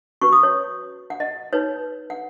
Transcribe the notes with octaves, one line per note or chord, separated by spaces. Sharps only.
C#4 F#4 B4 C#6
D#6
C#5
F#5
D#5
D#4 B4 C#5
F#5